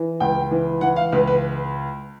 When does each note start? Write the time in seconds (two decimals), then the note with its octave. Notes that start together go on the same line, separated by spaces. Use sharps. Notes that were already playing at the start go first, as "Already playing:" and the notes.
Already playing: E3
0.20 C#2 G5
0.51 E3
0.81 E3 F#5
0.96 F5
1.12 C#2 B4
1.27 B4